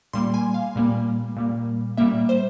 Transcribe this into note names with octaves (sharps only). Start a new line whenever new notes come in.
A#2 G3 A#3 C6
G#5
F5
A#2 G3 A#3
A#2 G3 A#3
A#2 G3 A#3 E5
C5